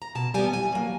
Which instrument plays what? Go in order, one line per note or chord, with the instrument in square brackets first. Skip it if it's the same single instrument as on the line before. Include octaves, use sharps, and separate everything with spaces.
[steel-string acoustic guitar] A#5
B2 A5
G3 B3 G#5
A2 G#5
F#3 A#3